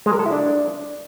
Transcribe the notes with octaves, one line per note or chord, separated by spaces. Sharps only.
G#3
A#4
A4
E4
D4